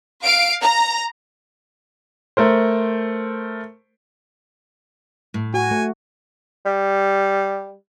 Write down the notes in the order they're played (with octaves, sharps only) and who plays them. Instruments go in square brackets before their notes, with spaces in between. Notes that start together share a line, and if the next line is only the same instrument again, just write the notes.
[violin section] F5 D7
A#5
[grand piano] A3 A#4 C5
[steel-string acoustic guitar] A2
[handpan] F#4 [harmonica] G#5
[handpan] A3
[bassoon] G3